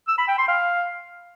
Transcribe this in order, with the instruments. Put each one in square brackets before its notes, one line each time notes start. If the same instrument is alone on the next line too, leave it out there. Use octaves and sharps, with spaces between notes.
[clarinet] E6
B5
G5
C6
F5